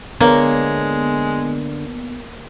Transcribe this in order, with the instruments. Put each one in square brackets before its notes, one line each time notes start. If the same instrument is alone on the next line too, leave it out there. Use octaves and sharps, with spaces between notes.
[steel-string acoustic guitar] D3 D4 C#5 [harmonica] G#3 [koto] A#3 [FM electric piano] B3